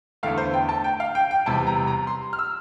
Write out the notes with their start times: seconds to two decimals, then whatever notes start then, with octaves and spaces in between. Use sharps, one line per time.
0.23 E2 D3 A3 F5
0.37 C5
0.53 G5
0.69 A5
0.84 G5
1.00 F5
1.15 G5
1.31 G5
1.46 E2 C3 G3 A5
1.67 A#5
1.87 A#5
2.07 C6
2.33 F6
2.39 E6